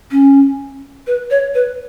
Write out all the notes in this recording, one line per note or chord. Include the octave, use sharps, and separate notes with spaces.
C#4
B4
C#5
B4